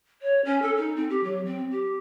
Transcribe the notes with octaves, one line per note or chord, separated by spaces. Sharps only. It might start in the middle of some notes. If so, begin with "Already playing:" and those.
C#5
C#4
A4
D#4
C4
G4
F#3
C4
G4